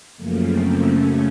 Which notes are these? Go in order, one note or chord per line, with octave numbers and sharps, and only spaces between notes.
F#2 C#3 F3 A3 A#3
C4
F#2 C#3 A3 C#4